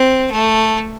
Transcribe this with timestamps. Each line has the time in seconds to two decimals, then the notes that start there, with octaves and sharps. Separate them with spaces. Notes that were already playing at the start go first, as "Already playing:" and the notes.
Already playing: C4
0.32 A3